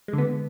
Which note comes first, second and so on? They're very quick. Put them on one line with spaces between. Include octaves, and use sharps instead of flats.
G#3 D3 B3